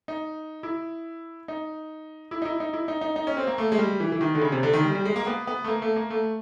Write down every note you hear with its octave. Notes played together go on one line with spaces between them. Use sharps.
D#4
E4
D#4
E4
D#4
E4
D#4
E4
D#4
D#4
D#4
C#4
C4
A#3
A3
G#3
G3
E3
E3
D#3
D3
C#3
C3
D3
D#3
G3
G3
G#3
A#3
B3
B3
A3
A#3
A3
A#3
A3